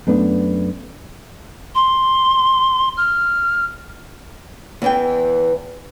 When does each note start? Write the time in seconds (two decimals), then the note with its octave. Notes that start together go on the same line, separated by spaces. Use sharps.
0.07 F#2 A3 B3 D4
1.75 C6
2.97 F6
4.82 E2 E3 G5